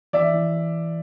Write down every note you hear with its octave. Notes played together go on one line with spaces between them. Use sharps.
E3 D5 E5
E3